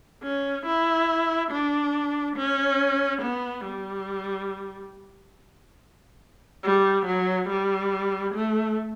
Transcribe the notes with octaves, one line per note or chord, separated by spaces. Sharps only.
C#4
E4
D4
C#4
B3
G3
G3
F#3
G3
A3